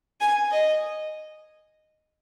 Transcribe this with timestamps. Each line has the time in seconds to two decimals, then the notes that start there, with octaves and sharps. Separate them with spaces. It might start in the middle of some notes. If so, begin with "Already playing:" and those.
0.20 G#5
0.51 D#5